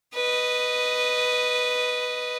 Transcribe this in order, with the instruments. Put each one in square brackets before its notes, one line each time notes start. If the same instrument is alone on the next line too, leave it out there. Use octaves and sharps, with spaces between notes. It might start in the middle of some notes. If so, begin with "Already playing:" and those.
[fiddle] B4 D#5